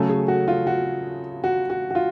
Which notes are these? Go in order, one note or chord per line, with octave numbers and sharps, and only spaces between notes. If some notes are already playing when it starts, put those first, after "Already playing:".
Already playing: C#3 F#3 A3 C#4 A4
G#4
F#4
F4
F#4
F#4
F#4
F#4
F4